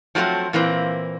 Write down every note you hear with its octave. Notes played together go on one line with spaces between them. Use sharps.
F3 F#3 A3 A#3 C4
A#2 E3 A#3 C4